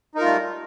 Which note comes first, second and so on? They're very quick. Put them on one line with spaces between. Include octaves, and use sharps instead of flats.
D#4 A#4 F4 A3 G3